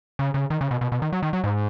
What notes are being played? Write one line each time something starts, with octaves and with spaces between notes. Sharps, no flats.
C#3
C#3
D#3
C#3
B2
B2
B2
D#3
F#3
D#3
F#3
G#2